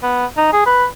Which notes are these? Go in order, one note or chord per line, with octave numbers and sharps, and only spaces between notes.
B3
D#4
G#4
B4